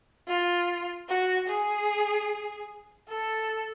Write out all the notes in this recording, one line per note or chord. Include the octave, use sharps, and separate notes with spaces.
F4
F#4
G#4
A4